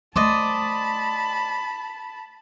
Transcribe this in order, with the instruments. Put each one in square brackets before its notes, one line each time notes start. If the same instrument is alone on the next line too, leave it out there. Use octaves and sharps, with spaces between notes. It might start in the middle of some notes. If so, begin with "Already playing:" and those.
[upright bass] A3 [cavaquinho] C5 D5 D#5 [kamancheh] A5 B5